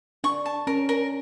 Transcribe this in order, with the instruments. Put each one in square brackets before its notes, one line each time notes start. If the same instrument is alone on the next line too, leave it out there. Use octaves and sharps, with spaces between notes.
[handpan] D4 [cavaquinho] C#6
[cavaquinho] A5
[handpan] C#4 [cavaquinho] A#4
[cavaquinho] A#4